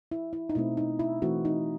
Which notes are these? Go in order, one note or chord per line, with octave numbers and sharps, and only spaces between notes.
E4
E4
D#4
B2 A3 C4 E4
D#4
E4
E3 A3 C4 F#4
D#4